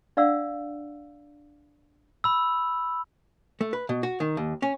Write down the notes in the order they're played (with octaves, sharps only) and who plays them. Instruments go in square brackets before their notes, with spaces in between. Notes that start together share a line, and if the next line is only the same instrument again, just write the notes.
[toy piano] D4 D5 F5 F#5 E6
[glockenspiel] B5 E6
[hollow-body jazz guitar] A3
B4
B2
F#4
D#3
D#2
C#4